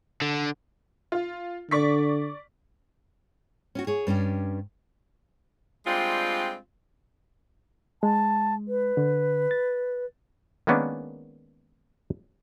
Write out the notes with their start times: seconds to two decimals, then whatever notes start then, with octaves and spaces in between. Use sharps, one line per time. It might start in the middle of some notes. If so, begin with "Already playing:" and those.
0.22 D3
1.12 F4
1.71 D3 D5 C#6 B6
3.75 C#4 F4 F#4
3.87 G#4 C#5
4.07 G2 C#4 D4 G4
5.86 G3 G#3 C4 D4 F4
8.03 G#3 A5
8.68 B4
8.97 D3
9.51 A6
10.67 D#3 G#3 A#3 B3 C#4 D4